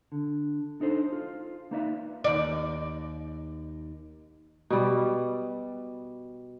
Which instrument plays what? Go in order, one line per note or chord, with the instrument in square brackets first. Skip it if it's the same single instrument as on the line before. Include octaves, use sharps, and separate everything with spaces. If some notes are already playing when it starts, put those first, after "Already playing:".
[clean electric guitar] D3
D4 D#4 A4 C5
F4
A#3 D#4 B4 D5 E5
[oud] D#2 D5
[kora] B2 G3